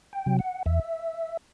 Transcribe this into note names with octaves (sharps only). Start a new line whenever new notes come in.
G5
C3 F#3
F#5
E2 E5